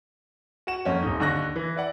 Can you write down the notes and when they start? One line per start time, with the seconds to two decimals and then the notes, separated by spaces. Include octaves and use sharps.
0.67 F#4 F#5 E7
0.85 F2 A#3 C#4
1.02 D#1 D#4
1.20 D#2 D3 C#6 F#6 A#6
1.56 E3
1.76 E4 D5 F#5